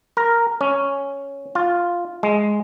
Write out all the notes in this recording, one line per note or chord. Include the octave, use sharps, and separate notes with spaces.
A#4
C#4
F4
G#3